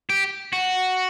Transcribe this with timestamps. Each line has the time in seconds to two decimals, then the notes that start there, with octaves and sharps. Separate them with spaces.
0.10 G4
0.53 F#4